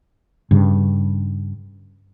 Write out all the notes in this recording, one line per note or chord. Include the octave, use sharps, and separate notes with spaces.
G2 C#3